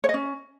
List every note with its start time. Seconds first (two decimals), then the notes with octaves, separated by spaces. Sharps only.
0.04 C#5
0.09 D#5
0.14 C#4